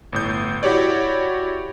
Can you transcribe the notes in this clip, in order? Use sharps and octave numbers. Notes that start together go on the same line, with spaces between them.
G1 A2 G6
E4 F#4 G4 C#5 D5